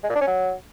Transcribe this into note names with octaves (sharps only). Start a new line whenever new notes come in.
G#3
A#2
D4
C#4
F#3